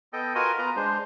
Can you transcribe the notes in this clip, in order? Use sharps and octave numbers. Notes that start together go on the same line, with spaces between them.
B3 A4 D#5 G5
F4 F#4 A#4 B4 D#5 G#5
B3 F4 B4 A#5
G#3 D4 C5